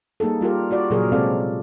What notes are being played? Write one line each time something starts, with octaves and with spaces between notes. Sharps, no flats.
G3 A#3 D#4 G#4 A4
G3 F4 G4 A#4
F4 F#4 D5
A#2 C#3 F#3 G#4 A#4
C3 G#3 C4 A4 D5 F5